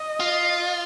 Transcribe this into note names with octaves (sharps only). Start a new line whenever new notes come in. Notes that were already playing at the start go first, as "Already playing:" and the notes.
Already playing: D#5
F4